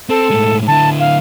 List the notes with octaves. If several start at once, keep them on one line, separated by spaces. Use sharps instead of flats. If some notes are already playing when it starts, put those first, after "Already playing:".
C4 A4
A2 G#3
D3 E4 A5
F5